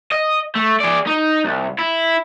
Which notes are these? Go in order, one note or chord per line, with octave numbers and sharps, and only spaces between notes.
D#5
A3
G#4 D5
D#4
C2
E4